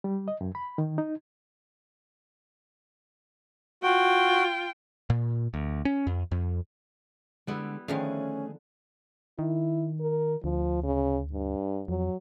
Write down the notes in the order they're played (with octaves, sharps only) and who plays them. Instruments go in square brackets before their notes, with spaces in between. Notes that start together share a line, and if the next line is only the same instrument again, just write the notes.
[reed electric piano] G3
D#5
F#2
B5
D#3
D#4
[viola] F4 G5 [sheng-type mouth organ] F#4
[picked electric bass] A#2
D2
C#4
F2
F2
[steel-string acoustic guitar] D3 G#3 [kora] G3 B3 E4
[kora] D3 [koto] D#3 F3 F5 [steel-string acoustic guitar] A3 G#4 D#5 [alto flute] C#4
[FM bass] D#3 [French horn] E4
[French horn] A#4
[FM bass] D2 [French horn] F3
[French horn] C#3
G2
[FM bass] F2 [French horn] F#3